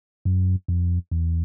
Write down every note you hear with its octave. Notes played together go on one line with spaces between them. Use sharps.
F#2
F2
E2